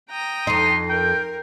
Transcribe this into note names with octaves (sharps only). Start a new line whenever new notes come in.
G5 A#5 D#6
F2 D#4 C6
A#4 G5